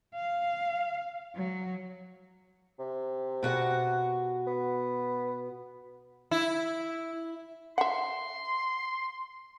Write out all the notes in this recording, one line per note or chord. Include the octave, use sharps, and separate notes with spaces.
F5
F#3
C3
B2 F#4 F#5
B3
E4
E5 F#5 C6